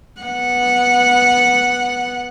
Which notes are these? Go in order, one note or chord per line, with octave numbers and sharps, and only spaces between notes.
B3 F#5